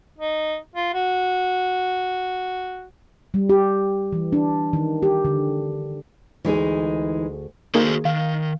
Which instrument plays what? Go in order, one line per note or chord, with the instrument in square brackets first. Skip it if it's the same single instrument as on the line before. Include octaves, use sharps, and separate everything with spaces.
[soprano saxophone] D#4
F4
F#4
[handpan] G3
G4
E3
D4
D#3
G4
D3
[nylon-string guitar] D2 G#4 [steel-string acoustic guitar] E3 G#3 D#4
[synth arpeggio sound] D#3 A#3 G#4 [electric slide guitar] F#4 A4 C5
[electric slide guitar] D#3 [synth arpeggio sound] F5